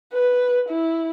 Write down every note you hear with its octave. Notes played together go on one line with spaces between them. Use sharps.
B4
E4